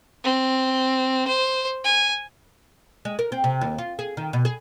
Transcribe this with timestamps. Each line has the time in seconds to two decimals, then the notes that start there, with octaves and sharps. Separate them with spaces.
0.24 C4
1.27 C5
1.84 G#5
3.05 G#3
3.19 A#4
3.32 C4
3.44 C3
3.61 D#2
3.78 F4
3.99 G#4
4.17 D#3
4.33 B2
4.45 G#4